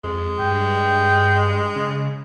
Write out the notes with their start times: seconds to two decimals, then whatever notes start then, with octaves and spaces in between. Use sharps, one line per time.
0.04 F2 G#3
0.40 G2 G5
1.76 C#3